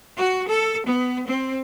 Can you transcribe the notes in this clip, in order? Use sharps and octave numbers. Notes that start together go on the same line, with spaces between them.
F#4
A4
B3
C4